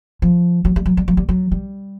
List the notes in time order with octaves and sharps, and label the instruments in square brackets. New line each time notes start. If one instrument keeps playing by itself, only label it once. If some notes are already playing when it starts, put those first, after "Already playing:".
[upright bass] F3
F#3
G3
F#3
G3
F#3
G3
F#3
G3